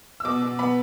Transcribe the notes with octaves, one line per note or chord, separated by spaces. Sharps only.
E6
B2 D6
B2
B3 B5